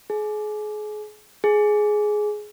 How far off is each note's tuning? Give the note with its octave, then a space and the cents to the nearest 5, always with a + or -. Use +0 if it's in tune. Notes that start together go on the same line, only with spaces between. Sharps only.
G#4 +35
G#4 +15